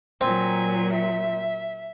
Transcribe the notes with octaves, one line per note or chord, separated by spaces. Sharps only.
A#2 F#3 C4 G#5
E5